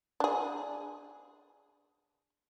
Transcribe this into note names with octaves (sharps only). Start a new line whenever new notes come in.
D4 G#4